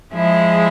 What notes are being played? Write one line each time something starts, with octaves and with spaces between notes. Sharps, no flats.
F3 G#3 E4 G#4